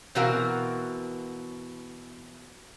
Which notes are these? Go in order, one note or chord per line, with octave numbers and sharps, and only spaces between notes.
B2 E3 C4 F#4 A#4 F5